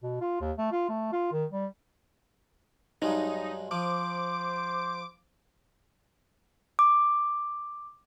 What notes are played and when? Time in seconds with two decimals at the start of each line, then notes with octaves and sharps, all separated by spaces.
0.03 B2
0.21 F4
0.41 D#2
0.58 A3
0.72 F4
0.89 A3
1.12 F4
1.32 D#3
1.52 G3
3.02 G2 F#3 G#3 D#4
3.71 F3 C5 D6
6.79 D6